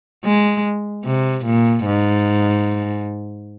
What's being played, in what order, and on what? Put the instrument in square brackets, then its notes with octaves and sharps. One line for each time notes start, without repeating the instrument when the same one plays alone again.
[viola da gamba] G#3
C3
A#2
G#2